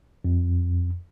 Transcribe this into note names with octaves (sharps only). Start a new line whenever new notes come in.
F2